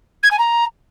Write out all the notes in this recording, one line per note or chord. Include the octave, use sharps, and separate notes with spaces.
G#6
G#5
A#5